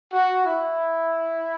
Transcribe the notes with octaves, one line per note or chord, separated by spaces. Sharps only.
F#4
E4